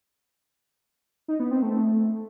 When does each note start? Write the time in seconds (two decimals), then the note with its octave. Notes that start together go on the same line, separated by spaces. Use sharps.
1.28 D#4
1.40 B3
1.51 C4
1.62 A3